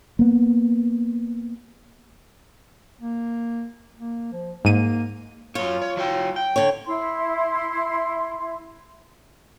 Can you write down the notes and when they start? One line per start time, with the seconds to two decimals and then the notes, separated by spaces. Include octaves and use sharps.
0.19 A#3 B3
3.01 A#3
3.99 A#3
4.32 F3
4.65 G#2 A#3 D#7
5.55 F#2 F4 C#5
5.82 C#5
5.97 F#3 C#5 G5
6.36 G5
6.56 D3 C#5
6.86 E4 C6